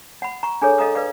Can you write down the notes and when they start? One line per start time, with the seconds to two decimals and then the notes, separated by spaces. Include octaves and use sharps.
0.22 F#5 B5
0.43 A#5 C#6
0.62 D4 G#4 A4 C#5
0.78 A4 D#5 F5 A#5 D6 D#6
0.95 B4 D5 F5 D6